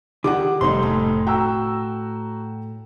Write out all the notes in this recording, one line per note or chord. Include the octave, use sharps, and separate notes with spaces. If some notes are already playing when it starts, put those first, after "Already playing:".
D3 D#3 G4 F#5 D6
F1 G2 C4 D#4 C6
A2
F#4 G5 A#5 E6